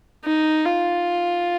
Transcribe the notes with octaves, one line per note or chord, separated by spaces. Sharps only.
D#4
F4